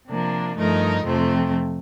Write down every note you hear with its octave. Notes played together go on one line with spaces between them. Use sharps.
C3 F3 A#3 D4
G2 F3 A3 D#4 A#4
F2 C3 F3 A3 C4